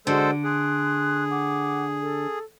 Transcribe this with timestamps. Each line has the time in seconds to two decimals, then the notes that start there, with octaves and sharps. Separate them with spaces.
0.07 D3 G#3 F#4 G#4 A4 C5 D5
0.44 G#4 C6 F#6
1.30 F#5 D6
2.01 A4